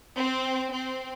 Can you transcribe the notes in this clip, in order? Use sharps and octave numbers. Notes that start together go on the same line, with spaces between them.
C4
C4